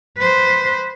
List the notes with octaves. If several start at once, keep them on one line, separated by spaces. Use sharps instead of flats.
B4 C5